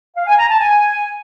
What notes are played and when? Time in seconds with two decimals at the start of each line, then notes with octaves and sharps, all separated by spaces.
0.16 F5
0.27 G#5
0.38 A#5
0.49 A5
0.59 G#5